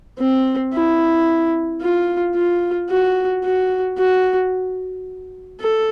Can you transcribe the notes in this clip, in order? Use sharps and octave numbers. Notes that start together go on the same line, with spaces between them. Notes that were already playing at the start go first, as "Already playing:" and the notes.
C4
E4
F4
F4
F#4
F#4
F#4
A4